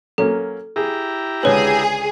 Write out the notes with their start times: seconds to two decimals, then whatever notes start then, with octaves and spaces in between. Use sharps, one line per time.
0.18 F#3 A#3 C#4 A4
0.76 E4 G4 G#4 A#5
1.43 C#2 D3 G#3 G#4 B4 C#5